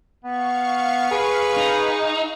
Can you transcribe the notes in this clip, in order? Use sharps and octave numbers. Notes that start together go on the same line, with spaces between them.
B3 F5 C#6
G#4 B4
D#4